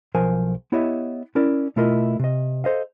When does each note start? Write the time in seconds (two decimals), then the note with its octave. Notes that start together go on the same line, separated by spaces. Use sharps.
0.15 B1 F3 A#4 C5 F5 G#5
0.72 B3 E4 G4 C#5 D#5 E5
1.35 C#4 E4 A#4 D5
1.76 B2 A3 E4 F4 A#4 D#5
2.19 C3 D#5
2.64 A4 C5 D#5 F5